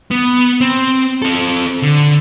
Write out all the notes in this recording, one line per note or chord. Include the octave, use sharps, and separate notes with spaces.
B3
C4
C4 A4
D3